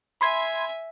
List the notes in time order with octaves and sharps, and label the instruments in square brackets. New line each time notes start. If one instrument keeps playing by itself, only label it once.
[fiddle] E5 G#5 [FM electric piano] B5 C6 G#6